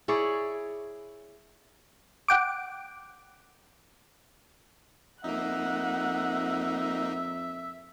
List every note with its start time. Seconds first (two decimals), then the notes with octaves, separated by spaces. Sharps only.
0.08 E4 G#4 C#5 D5
2.28 F#5 G5 D6
5.24 F2 A#3 D#4 E5 F#5